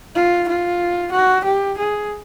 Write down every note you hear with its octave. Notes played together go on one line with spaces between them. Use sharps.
F4
F4
F#4
G4
G#4